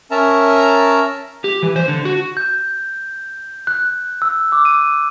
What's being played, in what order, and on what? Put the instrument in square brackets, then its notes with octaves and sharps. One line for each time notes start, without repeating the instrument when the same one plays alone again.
[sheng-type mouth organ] C#4 A#4 E5 A5 A#5
[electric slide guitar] G4
E3
C5
D3
F#4
[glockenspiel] G6
F#6
E6
D6
D#7